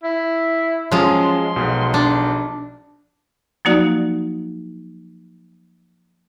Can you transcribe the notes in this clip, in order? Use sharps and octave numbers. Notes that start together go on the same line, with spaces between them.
E4
F3 F#3 G#3 C#4 F4 C6
B1 B2
D4
F3 F#3 A#3 D#4 F#4 D5